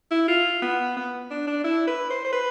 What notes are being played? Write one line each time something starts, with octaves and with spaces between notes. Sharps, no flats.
E4
F4
B3
B3
D4
D4
E4
B4
C5
C5
B4